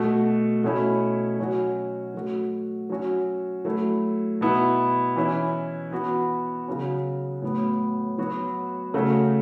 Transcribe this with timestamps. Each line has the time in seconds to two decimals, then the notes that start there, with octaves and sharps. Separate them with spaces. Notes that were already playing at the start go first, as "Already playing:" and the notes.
Already playing: B2 A3 F#4
0.64 B2 A3 C#4 E4
1.39 F#3 C#4 F#4
2.14 F#3 A3 F#4
2.89 F#3 C#4 F#4
3.65 F#3 A3 E4
4.41 B2 B3 E4
5.16 E3 C#4 E4
5.91 E3 B3 F#4
6.67 C#3 F#3 C#4 F#4
7.42 A2 F#3 B3
8.18 F#3 B3 F#4
8.94 C#3 A3 C#4 F#4